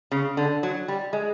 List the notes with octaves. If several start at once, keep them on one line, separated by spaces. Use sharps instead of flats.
C#3
D3
F#3
G3
G#3